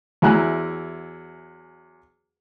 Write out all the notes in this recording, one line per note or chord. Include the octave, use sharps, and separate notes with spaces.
E2 F#3 E4 G#5 A#5 F#6